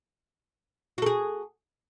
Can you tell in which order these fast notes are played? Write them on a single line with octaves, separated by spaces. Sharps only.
F#4 A4 G#4